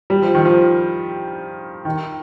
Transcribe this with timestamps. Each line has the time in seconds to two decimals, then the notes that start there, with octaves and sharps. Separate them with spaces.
0.10 G3
0.22 F3
0.35 D#3
0.45 F3
1.85 D#3